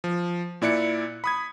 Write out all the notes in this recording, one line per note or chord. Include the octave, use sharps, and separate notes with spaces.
F3
A#2 E4 D5 F#6 C#7
B5 D#6 G#6